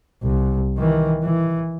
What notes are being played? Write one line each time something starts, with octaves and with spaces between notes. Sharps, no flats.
C2
D#3 E3
E3